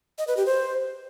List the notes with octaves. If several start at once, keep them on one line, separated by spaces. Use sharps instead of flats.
D#5
B4
G4
C5